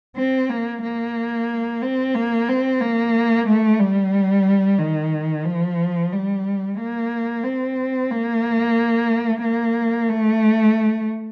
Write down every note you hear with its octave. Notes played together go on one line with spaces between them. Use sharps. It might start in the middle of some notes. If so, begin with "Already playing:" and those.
C4
A#3
A#3
C4
A#3
C4
A#3
A3
G3
D#3
F3
G3
A#3
C4
A#3
A#3
A3